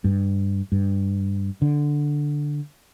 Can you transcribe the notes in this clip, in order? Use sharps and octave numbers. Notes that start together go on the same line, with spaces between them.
G2
G2
D3